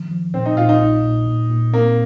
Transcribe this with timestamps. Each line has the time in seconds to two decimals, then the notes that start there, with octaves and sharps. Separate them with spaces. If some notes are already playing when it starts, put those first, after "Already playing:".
Already playing: D#3 F3
0.11 F3
0.33 A#2 C4
0.46 D#4
0.56 A#2 F4
0.69 D#4
0.80 A#1
1.04 A#2
1.27 A#2
1.49 A#2
1.73 A#3 C4